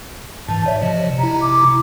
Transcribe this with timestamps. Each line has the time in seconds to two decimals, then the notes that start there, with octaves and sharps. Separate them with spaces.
0.49 G#2 E3 A5
0.66 C#5 D5 E5
0.81 C3 F3 D#5
1.19 C3 E4 A#5
1.41 D6